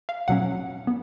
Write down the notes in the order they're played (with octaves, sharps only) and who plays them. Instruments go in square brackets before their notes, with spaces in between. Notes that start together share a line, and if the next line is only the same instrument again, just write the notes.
[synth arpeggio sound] F5
B2 F#3 C#4 F#5
B3